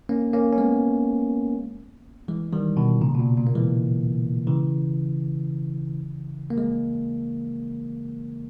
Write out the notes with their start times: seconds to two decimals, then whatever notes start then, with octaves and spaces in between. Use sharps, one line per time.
0.09 A#3 C#4
0.33 A#3 C#4
0.52 C#4
0.58 G#3 B3
2.28 E3 G#3
2.53 D#3 G3
2.76 B2 D#3
3.01 A#2 C#3
3.15 B2
3.19 A#2
3.38 A#2
3.47 A#3
3.55 E3 G#3
4.47 C#3 E3
6.50 A#3
6.58 G#3